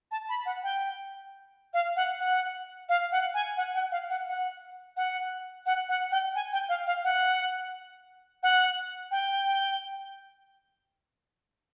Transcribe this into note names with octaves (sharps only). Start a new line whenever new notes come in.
A5
B5
F#5
G5
F5
F#5
F#5
F5
F#5
G#5
F#5
F#5
F5
F#5
F#5
F#5
F#5
F#5
G5
G#5
G5
F5
F5
F#5
F#5
G5